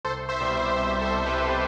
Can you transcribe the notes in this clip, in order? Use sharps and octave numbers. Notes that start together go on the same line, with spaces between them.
C2 A4 C5
C5 E5
B2 G3
C2 C5 E5
A4 C5
B2 G3
G4 B4